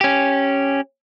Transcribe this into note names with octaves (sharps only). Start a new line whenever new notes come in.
C#4 G4